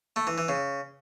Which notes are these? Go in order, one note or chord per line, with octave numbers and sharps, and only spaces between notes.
A3
E3
E3
C#3